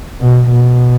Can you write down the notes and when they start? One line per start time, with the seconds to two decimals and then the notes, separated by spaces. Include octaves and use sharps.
0.20 B2
0.49 B2